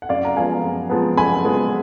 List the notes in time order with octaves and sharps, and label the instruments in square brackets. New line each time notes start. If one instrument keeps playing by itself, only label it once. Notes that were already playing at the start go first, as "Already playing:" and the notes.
[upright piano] F#5
F#2 D5 F5
A#5
F3 G#3 B3 F5 G#5
F#2
F3 G#3 B3
F#2 G#5 B5
F3 G#3 B3